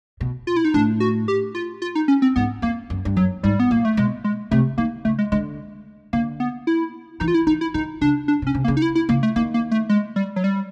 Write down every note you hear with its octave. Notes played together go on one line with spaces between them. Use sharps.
B2
F4
E4
D#4
A2 D4
F#4
G4
F4
F4
D#4
C#4
C4
G#2 B3
F2 A#3
F#2
G2
F#2 F#3
G#2 G3
B3
A#2 A#3
A3
B2 G#3
G#3
C3 A3
D#3 A#3
C#3 A3
G#3
D3 G#3
D3 A#3
B3
E4
E3 D#4
F4
E4
E3 D#4
E4
D#3 D#4
C#3 D4
D4
C3
C#4
C3
A#3
C#3
D#4
E4
E4
C#3 A#3
A3
D#3 A#3
A#3
A3
G#3
G3
F#3
G3